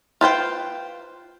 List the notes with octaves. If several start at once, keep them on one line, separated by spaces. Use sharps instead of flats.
F4 B4 C5 G5